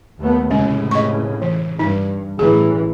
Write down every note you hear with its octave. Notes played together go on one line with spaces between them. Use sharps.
D#2 A3 B3
F1 A2 C#3 G#3 C#4
D#5 C#6
E3
G2 D#4
A1 E3 G#4